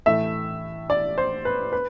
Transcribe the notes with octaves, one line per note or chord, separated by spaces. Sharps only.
A2 E3 A3 E5
D5
C5
B4
B4